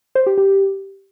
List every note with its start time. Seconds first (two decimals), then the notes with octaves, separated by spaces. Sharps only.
0.15 C5
0.27 G4
0.38 G4